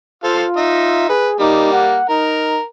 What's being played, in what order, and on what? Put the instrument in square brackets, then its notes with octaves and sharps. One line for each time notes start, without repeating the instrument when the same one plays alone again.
[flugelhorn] F4 [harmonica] A4 C5 F5
[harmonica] D#4 E5
[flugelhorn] G#4 [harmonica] B4
[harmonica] G3 A#3 [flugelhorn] D#4
[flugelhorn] F#5
[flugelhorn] D#4 [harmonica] A#4